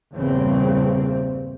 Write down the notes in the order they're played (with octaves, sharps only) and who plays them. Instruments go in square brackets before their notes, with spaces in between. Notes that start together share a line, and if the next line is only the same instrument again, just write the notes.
[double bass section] E2 G2 A#2 C#3 C4